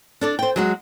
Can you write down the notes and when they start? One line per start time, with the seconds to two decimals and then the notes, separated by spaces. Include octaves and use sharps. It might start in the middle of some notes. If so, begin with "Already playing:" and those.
0.21 D4 A4 D5
0.39 C5 G5
0.56 F#3 G#3 F#4